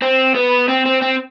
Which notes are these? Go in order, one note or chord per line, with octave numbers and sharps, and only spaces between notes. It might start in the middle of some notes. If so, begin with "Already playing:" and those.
C4
B3
C4
C4
C4